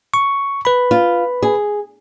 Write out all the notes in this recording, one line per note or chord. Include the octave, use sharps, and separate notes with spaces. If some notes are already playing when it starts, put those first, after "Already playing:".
C#6
B4 B5
F4
G#4